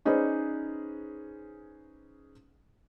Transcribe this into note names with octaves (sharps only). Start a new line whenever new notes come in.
C#4 D#4 G#4 B4 C5 D5